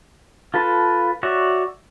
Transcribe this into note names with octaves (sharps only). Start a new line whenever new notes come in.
F4 A4 B4 A5
F#4 C#5 D5 E5